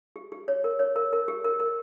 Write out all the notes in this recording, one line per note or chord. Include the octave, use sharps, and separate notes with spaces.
G4
G4
C#5
A#4
C#5
A#4
A#4
G4
A#4
A#4